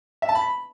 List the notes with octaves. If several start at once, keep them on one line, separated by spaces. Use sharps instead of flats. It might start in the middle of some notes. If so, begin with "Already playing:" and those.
E5
A5
B5